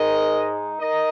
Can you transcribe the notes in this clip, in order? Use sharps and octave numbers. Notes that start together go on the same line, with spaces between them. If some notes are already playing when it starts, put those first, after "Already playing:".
Already playing: G#2 G#3 D#4 A#4 D#5
D#4 A#4 D#5